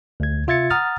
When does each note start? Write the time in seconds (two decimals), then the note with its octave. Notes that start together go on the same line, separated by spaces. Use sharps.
0.20 D2 G#6
0.47 C3 F4 E5 G#6 A6 C#7
0.70 F#5 A#5 D#6 F6 A6